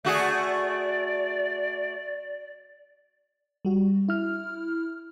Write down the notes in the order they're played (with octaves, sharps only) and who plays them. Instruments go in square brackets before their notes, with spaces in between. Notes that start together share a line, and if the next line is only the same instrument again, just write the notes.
[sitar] A3 F#4 G#4 [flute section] D5
[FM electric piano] G3 F#4
E4 F6